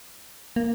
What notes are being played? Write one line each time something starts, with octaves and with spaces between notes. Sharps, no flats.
A#3